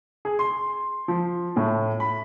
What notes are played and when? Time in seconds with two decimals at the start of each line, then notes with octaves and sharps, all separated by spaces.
0.25 G#4
0.39 C6
1.08 F3
1.56 A2
2.00 B5